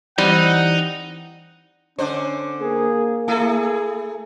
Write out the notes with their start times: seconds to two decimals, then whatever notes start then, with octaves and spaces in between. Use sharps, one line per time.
0.18 E3 G3 C4 D#4 F#5
1.98 D3 C#4 D4 C5
2.61 A#3 G#4 A#4
3.28 A3 E4 G#4 A4